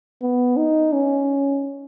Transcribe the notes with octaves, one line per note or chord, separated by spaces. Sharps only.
B3
D#4
C#4